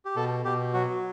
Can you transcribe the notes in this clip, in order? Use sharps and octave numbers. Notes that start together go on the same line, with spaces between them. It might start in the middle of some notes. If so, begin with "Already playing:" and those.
G4
B2 A4
B2 G4
F#3 F#4